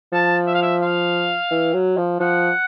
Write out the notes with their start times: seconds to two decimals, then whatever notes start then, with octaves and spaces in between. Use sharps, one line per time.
0.12 F3 A5
0.47 E5
0.55 F5
0.62 E5
0.82 F5
1.51 E3
1.74 F#3
1.97 F3
2.20 F3 F#5